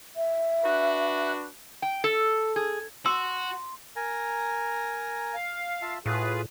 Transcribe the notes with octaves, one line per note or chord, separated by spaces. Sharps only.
E5
D4 F#4 B4
G5
A4
G#4
F#4 C6 E6
A#4 G#5 A#5
F5
F4 E5 A5
A2 F4 F#4 G#4 B4 F5